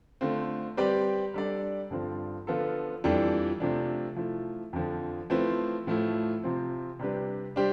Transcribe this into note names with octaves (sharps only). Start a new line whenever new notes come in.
D3 A3 C4 F4
G3 C4 G4 B4 D5
G3 D4 A4 D5
G2 D3 F3 C4
D3 F3 B3 F4 A4
F2 E3 G3 D4 A4
C3 F3 A3 D4
F3 A3 E4
F2 D3 F3
F3 A3 C4 E4 B4
A2 F3 A3 E4
C3 F3 C4
C3 G3 D4 G4 B4
G3 D4 G4 C5